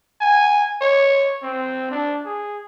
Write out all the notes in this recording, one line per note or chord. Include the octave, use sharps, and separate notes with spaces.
G#5
C#5
C4
D4
G#4